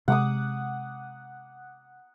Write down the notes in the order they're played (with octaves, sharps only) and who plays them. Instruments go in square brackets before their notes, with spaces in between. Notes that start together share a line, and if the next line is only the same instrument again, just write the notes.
[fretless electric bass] C3 G#3 [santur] F#5 D6 D#6